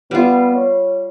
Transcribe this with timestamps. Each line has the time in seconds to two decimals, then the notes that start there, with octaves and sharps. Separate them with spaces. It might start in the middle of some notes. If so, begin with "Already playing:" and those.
0.11 G3 B3 F4
0.55 C#5